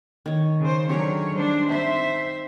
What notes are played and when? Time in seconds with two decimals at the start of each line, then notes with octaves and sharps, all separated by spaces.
0.26 D#3 C#5
0.60 C#3 C5
0.89 D3 F#3 G4 G#4 A#4 C#5
1.38 G3 D4 C5
1.69 C4 D#4 C5 E5